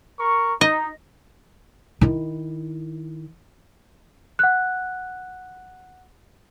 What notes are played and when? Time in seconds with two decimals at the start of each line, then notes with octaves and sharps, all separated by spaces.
0.20 A#4 C#6
0.61 D#4 D#5
2.01 D#3 E4
4.39 F#5 F#6